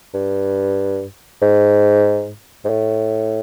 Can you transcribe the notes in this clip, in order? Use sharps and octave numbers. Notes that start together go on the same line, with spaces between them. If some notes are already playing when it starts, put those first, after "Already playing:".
G2
G#2
G#2
A2